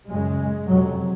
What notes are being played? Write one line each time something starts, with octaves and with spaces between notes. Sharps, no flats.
F#2 C#3 G#3
F2 C3 F#3